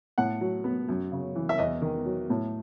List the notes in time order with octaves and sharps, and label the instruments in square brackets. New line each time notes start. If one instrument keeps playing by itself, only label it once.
[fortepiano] A2 F#5
F#3
B3
F#2
C#3
E3
E5
E2 D#5
D#3
F#3
A2